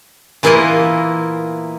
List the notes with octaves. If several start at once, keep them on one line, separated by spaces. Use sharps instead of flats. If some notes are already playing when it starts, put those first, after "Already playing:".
A#2 E3 A#3 B3 E4 D#5